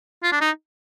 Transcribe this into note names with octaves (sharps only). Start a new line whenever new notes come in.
F4
D4
D#4